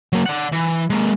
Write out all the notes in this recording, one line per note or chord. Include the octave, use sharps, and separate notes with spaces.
F#3 A#3
D5 F#5
E3
G#3 A#3